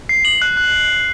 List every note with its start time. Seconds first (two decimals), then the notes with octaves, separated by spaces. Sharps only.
0.09 C7
0.25 F#7
0.42 F#6
0.57 F#6